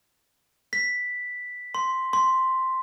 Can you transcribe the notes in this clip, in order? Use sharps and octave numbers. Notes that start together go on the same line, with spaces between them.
B6
C6
C6